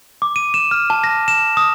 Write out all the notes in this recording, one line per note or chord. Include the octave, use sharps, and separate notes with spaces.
D6
D#7
E7
F6
A5
A#6
E7
D#6